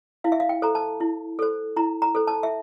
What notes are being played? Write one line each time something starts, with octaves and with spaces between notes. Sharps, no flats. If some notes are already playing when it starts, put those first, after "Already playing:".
E4 F5
E5
F5
G5
A4 C5 A#5
A5
E4
A4 C5
E4 A#5
A#5
A4 C5
A5
E5